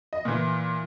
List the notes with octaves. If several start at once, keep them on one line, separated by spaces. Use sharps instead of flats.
D#5
A#2 E3